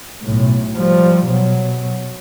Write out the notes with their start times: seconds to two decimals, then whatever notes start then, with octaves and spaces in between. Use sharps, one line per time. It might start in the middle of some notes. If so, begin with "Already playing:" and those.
0.22 B1 A2
0.77 F3 G3
1.26 B2 F#3